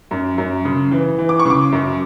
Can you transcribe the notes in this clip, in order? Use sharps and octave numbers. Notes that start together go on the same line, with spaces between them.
F#2
F#2
C#3
E3
E3
D6
C#6
C#3 D6
F#2